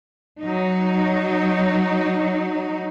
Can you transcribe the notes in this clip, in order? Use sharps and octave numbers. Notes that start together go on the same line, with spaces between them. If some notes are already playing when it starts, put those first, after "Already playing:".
F#3 D#4